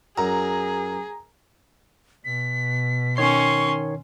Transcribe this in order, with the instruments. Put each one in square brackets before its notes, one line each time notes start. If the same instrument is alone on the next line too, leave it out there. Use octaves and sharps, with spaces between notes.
[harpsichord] F#2 [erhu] G#4 [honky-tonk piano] A#5
[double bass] B2 [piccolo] B6
[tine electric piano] D#3 C#5 C7 [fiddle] C#4 C6 [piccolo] C#6